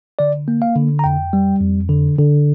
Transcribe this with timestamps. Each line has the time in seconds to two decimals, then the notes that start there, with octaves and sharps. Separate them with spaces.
0.19 D3 D5
0.48 A#3
0.62 F5
0.76 D3
0.99 A#5
1.04 F2 G5
1.33 G3
1.61 F2
1.89 D3
2.19 D3